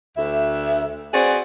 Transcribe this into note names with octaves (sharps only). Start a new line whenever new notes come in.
D2 E5
C4 F#4 G#4 B4 D5